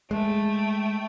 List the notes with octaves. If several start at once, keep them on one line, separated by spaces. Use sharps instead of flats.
G#3 A3 G5